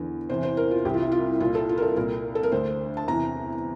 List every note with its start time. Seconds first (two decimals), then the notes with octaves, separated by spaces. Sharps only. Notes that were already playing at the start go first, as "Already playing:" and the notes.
Already playing: E2 D3
0.29 E2 C3 E3 C5
0.43 C5
0.57 A#4
0.71 F4
0.85 C2 C3 E3 G4
0.94 F4
1.03 E4
1.12 F4
1.40 C2 A#2 F4
1.55 A4
1.69 F4
1.78 A#4
1.82 A4
1.97 C2 A#2 A#4
2.35 A4
2.43 A#4
2.52 D2 D3 C5
2.97 A5
3.08 E2 C3 E3 A#5